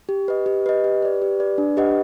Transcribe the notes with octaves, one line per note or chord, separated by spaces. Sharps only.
G4
B4 D#5
G4
B4 D#5
G4
B4 D5
G4
B4 D5
D4
G4 B4 D#5 F#5